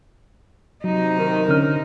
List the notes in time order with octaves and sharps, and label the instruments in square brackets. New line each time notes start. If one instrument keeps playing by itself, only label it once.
[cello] C3 D#4 [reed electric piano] F#3
[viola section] D#3
[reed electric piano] D3 C#4 F6 [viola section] A#4